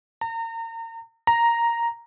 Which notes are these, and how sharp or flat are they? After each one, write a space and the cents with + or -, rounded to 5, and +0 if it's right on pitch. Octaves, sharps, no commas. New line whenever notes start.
A#5 -35
A#5 +0